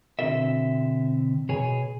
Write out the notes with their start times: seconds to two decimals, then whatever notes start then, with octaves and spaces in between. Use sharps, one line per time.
0.19 B2 D3 C4 F4 A4 E5
1.49 B2 G#4 C#5 G#5